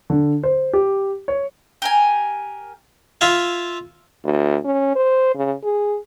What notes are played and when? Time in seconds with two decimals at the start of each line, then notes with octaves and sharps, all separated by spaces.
0.10 D3
0.43 C5
0.73 G4
1.28 C#5
1.82 G4 A#4 G#5
3.21 F4 E5 F5 G#5
4.24 D2
4.65 C#4
4.96 C5
5.35 C#3
5.64 G#4